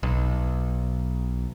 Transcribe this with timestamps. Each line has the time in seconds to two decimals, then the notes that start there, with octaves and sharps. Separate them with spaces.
0.03 B1